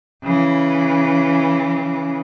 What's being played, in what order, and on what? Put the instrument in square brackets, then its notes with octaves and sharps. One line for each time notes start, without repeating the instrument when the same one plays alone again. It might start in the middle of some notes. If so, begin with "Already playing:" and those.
[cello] C#3 E3